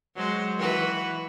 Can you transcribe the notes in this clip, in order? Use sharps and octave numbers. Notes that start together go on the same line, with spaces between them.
F#3 G#3 C5
E3 F#4 B4